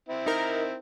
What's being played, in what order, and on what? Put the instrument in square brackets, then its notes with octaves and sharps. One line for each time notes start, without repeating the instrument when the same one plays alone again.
[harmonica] C4 E4
[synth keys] D#4 A#4